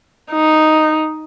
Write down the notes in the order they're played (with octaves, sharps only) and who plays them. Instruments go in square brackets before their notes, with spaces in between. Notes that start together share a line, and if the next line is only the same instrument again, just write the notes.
[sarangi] D#4